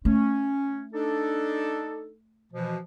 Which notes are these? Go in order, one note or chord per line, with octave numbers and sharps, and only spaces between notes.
A3 C#4
D4 D#4 A4
B2 E3 F3